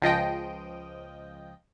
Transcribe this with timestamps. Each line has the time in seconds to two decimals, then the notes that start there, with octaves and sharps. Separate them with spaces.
0.02 C#2 F3 D#5 G5